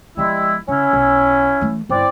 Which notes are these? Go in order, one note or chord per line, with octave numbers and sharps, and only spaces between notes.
F3 G3 G#3 B3 E4
C#3 C#4 E4
B1
E3 A3
G1 C4 E4 D5